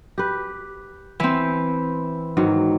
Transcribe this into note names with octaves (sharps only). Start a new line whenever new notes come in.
G4 B4
E3 C4
G#2 D#3 F#3